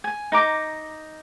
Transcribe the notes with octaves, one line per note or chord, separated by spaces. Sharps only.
G#5
D#4 A#5 D6